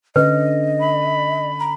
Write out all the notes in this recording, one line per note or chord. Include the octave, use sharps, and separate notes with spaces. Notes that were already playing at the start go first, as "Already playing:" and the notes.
D3 C#4 B4 D#5
B5
A#5